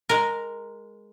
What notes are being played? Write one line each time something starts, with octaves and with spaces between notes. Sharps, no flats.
G#3 A#4